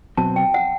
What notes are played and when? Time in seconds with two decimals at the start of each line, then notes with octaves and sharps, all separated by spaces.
0.17 B2 F#3 C4 A5
0.36 G5
0.54 F#5